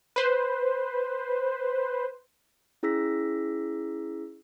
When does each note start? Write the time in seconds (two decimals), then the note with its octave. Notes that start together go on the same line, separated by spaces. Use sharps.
0.16 B4 C5
2.83 C#4 E4 G#4 E6 A#6 B6